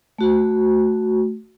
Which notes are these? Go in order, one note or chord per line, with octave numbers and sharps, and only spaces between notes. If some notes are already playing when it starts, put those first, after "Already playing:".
A3 F#4